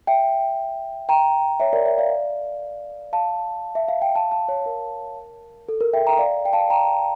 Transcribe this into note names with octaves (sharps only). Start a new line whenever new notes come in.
E5 G5
G5 A#5
C#5 E5
A#4 D5
C#5 E5
D5 F5
F5 A5
E5
F5
G5
F5 A5
F5 A5
C#5
A#4
A4
A#4
E5 G5
G5 A#5
D5 F5
G5
F5 A5
G5 A#5